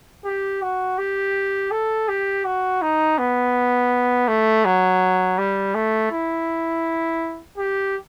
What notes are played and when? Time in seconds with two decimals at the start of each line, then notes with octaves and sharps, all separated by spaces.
0.25 G4
0.62 F#4
0.98 G4
1.71 A4
2.08 G4
2.45 F#4
2.82 D#4
3.18 B3
4.28 A3
4.65 F#3
5.38 G3
5.75 A3
6.11 E4
7.58 G4